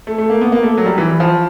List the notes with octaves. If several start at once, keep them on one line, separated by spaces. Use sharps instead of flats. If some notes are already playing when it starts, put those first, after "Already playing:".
A3
A3
A#3
B3
A#3
A3
F#3
G3
E3
F3